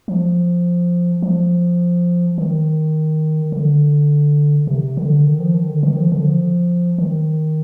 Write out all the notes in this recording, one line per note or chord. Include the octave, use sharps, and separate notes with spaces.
F3
F3
D#3
D3
C3
D3
D#3
F3
D#3
D3
D#3
F3
D3
F3
D#3